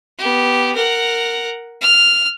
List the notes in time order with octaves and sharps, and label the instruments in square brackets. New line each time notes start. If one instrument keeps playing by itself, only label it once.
[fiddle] B3 G4
A#4 F#5
F6